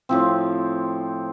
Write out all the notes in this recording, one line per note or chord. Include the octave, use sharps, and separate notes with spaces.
A2 F3 C4